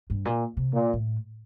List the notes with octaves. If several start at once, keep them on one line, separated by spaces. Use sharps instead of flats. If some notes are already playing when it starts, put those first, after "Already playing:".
G2
A#2
C3
A#2
A2